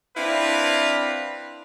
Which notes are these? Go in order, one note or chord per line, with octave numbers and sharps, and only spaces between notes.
C4 D4 E4 B4 F5